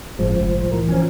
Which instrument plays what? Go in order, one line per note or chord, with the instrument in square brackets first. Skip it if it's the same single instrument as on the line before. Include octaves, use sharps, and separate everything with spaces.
[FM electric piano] G1 G#3 [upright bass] A2 C#4 [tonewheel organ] F3
[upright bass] C2 A2
[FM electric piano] E3 A#4
[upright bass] A#1 D3 [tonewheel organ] F3 C#4